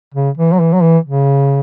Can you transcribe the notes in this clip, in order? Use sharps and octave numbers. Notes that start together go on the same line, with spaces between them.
C#3
E3
F#3
E3
F#3
E3
C#3